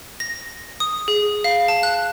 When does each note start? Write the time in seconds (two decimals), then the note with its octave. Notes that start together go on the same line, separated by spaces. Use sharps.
0.20 A#6
0.80 D#6
1.08 G#4
1.44 F5
1.68 A5
1.83 F#6